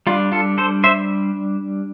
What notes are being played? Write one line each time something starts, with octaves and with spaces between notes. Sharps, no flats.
G3 D4 F4
F4 A4
A4 C5
C5 E5